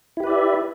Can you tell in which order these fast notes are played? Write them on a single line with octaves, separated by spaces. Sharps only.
E4 G4 B4 D5 E5